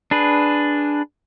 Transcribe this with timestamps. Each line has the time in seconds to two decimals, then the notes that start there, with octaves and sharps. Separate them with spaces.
0.11 D4 G#4 B4